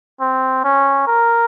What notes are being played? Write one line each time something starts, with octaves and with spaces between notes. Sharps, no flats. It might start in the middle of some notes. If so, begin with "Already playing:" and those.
C4
C#4
A#4